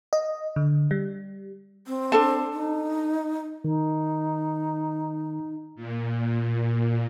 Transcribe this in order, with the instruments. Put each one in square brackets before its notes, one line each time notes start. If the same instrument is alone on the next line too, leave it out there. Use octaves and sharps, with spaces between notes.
[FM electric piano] D#5
D3
G3
[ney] C4
[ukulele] D4 A4 A5
[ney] D#4
[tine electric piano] D#3 [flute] D#4
[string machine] A#2